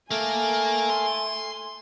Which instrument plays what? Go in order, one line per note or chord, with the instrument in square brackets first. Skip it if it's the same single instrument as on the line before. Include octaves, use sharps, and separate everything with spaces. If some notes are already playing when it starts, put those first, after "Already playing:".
[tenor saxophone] A3 [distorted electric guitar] A#3 [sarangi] G#5
[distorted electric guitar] C6